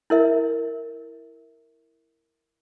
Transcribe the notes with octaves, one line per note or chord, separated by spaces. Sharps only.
E4 A#4 E5